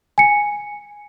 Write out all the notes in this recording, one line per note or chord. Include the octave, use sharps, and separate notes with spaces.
G#5 C#7